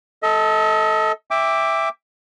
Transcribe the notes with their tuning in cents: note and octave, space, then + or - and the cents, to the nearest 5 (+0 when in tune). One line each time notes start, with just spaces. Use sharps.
A4 +0 D#5 +35
E5 +0 G5 +30 D6 +0